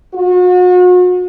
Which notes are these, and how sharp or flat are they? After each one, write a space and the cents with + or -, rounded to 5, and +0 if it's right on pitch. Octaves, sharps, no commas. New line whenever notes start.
F#4 -40